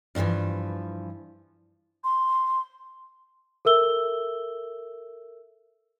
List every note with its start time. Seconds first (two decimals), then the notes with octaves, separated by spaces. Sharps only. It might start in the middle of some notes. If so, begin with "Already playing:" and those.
0.15 G2 B2 D3 E3 F3
2.04 C6
3.65 A4 A#4 E5 E6 G7